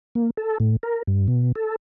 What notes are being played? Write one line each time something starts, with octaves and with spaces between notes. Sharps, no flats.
A#3
A4
A2
A#4
G2
B2
A4